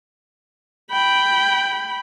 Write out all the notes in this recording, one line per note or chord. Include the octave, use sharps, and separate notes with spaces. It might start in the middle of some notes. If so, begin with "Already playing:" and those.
G5 B5